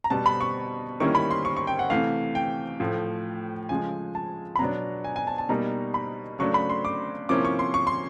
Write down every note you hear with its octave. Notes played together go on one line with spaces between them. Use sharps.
A#5
B2 G3 B3 A5
B5
C#6
D#3 G3 A#3 C#4 E4 C#6
B5
C6
C#6
C#6
G5
F#5
C3 E3 A3 F5
G5
A2 F3 A3
C#3 F3 G#3 G#5
A5
B5
B2 F#3 B3 D4 A#5
G#5
G#5
A5
A5
B2 G3 A#3 D#4 A#5
B5
C#3 F#3 A3 D4 C#6
B5
C6
D6
C3 F3 A#3 C#4 E4 D6
C#6
C6
C#6
C6